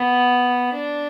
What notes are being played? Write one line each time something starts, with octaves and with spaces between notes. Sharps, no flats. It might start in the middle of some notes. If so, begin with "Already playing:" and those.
Already playing: B3
D4